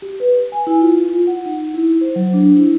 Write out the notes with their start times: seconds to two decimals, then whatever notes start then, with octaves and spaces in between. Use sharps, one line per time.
0.02 G4
0.20 B4
0.52 G#5
0.67 E4
0.82 F4
1.27 F#5
1.46 D#4
1.74 E4
2.01 C5
2.16 F#3
2.33 D4
2.57 E4